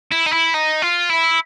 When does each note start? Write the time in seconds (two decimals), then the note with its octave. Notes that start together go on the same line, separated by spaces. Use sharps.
0.12 E4
0.26 D#4
0.33 E4
0.54 D#4
0.82 F4
1.10 E4